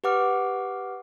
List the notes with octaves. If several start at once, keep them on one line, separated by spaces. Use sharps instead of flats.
G4 B4 F#5 D6 F6